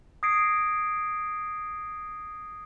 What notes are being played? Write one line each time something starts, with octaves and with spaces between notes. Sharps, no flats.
D#6 G#6 A#6 C7 D7